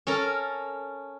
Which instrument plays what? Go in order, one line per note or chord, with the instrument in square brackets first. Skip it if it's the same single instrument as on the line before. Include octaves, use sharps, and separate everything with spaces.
[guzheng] C#4 A4 A#4